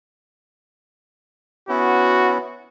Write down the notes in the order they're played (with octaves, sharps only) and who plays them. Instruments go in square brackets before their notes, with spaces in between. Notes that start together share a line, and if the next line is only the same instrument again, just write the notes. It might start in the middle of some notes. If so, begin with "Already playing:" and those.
[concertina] B3 C#4 E4 [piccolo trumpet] F#4